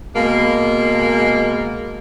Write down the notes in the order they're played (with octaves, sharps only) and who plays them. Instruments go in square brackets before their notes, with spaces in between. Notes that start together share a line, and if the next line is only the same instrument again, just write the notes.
[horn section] B2 G#3 A#3